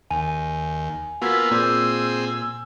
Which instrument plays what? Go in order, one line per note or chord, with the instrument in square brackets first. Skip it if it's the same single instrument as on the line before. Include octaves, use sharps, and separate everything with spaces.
[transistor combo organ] D#2 [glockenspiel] G#5
[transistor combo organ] A#3 B3 F4 [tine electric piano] F#4 G#6 B6 [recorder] E6
[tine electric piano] A#2 D6 G6 [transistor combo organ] C4 G#4